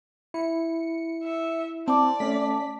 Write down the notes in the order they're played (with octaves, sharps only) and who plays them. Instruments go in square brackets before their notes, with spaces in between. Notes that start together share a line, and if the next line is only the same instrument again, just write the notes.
[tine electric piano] E4 [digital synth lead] C#7
[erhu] E5
[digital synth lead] C4 [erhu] D5 [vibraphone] A5 D6
[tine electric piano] A3 C#4 [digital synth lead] B6